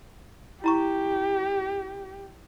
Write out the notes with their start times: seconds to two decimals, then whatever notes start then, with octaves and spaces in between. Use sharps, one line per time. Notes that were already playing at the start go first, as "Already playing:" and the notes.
0.64 E4 G4 A#5 C#6